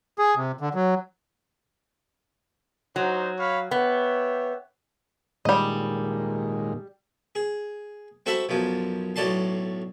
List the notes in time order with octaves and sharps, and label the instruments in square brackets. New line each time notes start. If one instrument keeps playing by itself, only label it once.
[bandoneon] G#4
C3
D3
F#3
[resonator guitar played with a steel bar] F#3 [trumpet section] D#4 F#4 C5
[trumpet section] C#5 F5 B5
[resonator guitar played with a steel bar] B3 [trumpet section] G4 C#5 E5
[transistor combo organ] A#2 D#3 G#3 [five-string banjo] G3 D#5
[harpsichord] G#4
C4 F#4 A4 E5 F#5 B5
B1 F#2 F3
B1 A2 F#4 D5 A5 C6